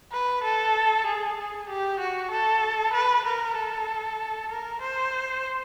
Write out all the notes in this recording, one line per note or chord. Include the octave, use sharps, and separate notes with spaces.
B4
A4
G#4
G#4
G4
F#4
A4
B4
A#4
A4
A#4
C5